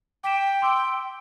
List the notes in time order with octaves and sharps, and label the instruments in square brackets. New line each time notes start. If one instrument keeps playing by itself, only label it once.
[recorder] G5 [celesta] D6 B6 E7
[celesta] C6 D6 E6